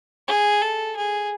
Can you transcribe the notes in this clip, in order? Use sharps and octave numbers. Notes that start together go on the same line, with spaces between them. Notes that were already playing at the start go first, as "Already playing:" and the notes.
G#4
A4
G#4